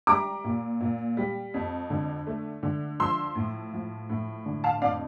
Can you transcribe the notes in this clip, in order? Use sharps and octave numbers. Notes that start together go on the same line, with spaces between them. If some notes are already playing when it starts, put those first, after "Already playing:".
G3 A#5 D6
A#2
A#2
G3
F2
D3
A3
D3
F3 C6 E6
A2
F3
A2
D3
F5 A5
F2 D5 F5